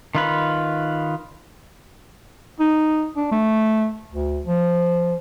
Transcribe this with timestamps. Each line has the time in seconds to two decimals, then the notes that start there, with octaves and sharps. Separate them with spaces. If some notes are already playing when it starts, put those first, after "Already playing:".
0.15 D#3 F4 B4
2.60 D#4
3.16 D4
3.32 A3
4.12 D2
4.46 F3